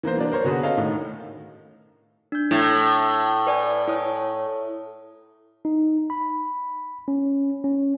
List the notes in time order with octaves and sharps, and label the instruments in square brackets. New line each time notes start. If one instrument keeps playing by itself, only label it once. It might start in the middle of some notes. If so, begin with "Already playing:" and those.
[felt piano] E3 A#3 B3 C5
F#3 A#3 D4
A#4 C5 C#5
D3 B3 F#4 G#4 B4
C#4 A4 D#5 F5
A2 D#3
[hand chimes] D4 G6
[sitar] A2 [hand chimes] E4
[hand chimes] B4 D5 G#5
E4 C#5 D#6
[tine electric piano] D#4
B5
C#4
C#4